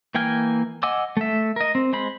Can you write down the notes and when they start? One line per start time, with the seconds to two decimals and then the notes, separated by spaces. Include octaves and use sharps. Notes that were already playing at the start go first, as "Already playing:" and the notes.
0.15 E3 A#3 G5 G#5 F6
0.83 D#5 F#5 G#5 D6 E6
1.17 A3 E5
1.56 A#4 D#5
1.75 C4
1.93 G#3 C5 B5